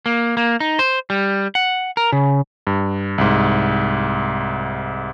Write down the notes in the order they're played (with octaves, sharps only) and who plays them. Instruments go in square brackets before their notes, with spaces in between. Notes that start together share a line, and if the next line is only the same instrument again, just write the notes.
[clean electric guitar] A#3
A#3
D#4
C5
G3
F#5
A#4
C#3
[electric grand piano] G2
C2 G#2